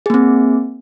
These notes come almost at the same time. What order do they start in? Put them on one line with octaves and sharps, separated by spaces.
G#4 A#3 C4